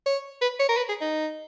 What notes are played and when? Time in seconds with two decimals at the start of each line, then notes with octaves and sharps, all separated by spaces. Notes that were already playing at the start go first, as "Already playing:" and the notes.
0.06 C#5
0.41 B4
0.59 C#5
0.69 A#4
0.77 B4
0.89 G#4
1.01 D#4